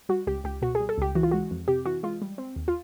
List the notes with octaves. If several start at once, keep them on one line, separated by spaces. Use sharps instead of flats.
G3 F#4
C#2 G4
C#2 G4
B2 F#4
G#4
G3
A4
C#2 G4
E3 F#4
F4
G#3 F#4
F2
C3 G4
E3 F#4
G#3 F4
G3
C4
D#2
F4